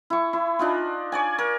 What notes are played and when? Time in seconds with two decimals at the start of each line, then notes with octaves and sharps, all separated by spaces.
0.10 E4 C#6
0.33 E4
0.59 D4 D#4 F4
1.12 C#5 D5 G#5
1.38 A#4